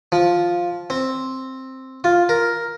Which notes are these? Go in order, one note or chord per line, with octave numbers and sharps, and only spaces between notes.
F3
C4
F4
A#4